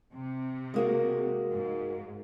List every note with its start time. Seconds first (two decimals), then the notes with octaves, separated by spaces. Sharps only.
0.13 C3
0.74 G#3 A#3 F#4
1.51 G#2